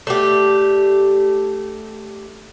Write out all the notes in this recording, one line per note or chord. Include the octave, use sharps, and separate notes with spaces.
A3 D4 G4